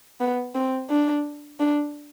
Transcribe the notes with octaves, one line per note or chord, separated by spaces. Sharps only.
B3
C4
D4
D4